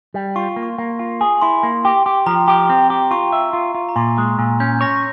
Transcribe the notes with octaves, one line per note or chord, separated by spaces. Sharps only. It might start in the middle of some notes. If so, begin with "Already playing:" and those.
G3
F4 C#6
C6
A#3
C#6
A#3
F4
G#4
E4 C6
A#3
G4
G4
F3 A#5
G4
C4
G4
F4 C#6
E5
F4
F4
A#5
A#2 C6
G#3 C6
C#6
A#2 E6
C#4 G6
C#5 A#6